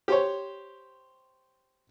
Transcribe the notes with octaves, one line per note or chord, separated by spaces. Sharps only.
G4 C5 C#5